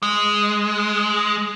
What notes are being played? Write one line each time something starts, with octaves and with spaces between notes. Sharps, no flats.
G#3